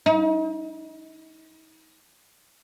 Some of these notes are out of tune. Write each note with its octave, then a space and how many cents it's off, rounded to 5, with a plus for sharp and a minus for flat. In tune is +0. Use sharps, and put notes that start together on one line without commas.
D#4 +40